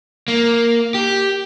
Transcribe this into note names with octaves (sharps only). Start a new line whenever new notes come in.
A#3
G4